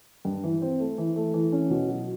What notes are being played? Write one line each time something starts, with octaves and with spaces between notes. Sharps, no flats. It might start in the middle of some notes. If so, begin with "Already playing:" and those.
G2
E3
C4
A3
E3
A3
E3
C#4
B2
F#3